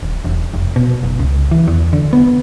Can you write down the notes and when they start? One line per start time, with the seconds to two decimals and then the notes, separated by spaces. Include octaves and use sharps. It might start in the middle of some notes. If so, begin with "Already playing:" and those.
0.03 D#1
0.25 E1
0.54 F1
0.76 B2
1.03 F#1
1.19 C#2
1.51 E3
1.68 E2
1.93 D3
2.13 B3